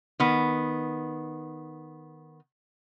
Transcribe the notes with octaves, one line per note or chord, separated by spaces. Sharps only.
D#3 B3